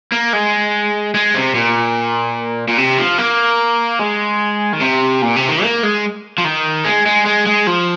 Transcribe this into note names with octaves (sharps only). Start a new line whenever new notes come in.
A#3
G#3
G#3
C3
A#2
A#2
C3
F3
A#3
G#3
D#3
C3
A#2
C3
D#3
A#3
G#3
F3
D#3
G#3
G#3
G#3
G#3
F3